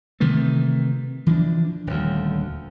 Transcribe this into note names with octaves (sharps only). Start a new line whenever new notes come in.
C3 D#3 E3 A3
E3 F3 A3 D4
D#1 D2